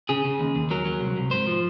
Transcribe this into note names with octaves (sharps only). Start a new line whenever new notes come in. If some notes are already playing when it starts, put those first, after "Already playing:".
C#3 G#4
C#3
D#2
D#2
F#3 A#4
F#3
C2
C2
G#2 C5
F3